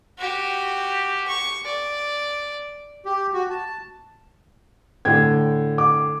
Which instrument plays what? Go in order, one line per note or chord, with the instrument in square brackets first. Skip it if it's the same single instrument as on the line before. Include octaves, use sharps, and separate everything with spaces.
[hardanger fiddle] F#4 G4
C#6
D5
[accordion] G4
F#4
A5
[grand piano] A2 D3 G5 [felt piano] G#6
[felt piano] D6